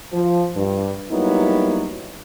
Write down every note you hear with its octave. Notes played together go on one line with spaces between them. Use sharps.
F3
G2
F#3 G3 A#3 B3 D#4 E4